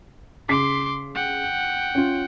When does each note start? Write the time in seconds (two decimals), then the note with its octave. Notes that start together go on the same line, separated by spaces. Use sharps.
0.49 C#3 C6 D6 B6 C7
1.15 F#5 G5
1.95 C#4 F4